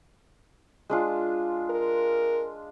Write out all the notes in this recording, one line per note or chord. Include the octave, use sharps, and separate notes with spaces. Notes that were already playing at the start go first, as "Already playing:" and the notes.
G#3 D4 F4
A#4